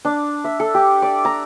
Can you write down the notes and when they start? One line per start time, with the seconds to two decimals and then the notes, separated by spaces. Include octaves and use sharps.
0.05 D4
0.44 E5
0.60 A4
0.74 G4
1.02 D5
1.25 A#5